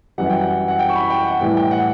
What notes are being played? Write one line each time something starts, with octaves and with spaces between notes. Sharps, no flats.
F#2 E3 G3 F#5
G5
F#5
F#5
G5
C#6
B5
G5
F#5
A2 E3 G3 G5
G5
F#5